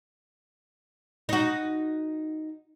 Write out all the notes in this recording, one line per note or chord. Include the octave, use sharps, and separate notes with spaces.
D#4 F#4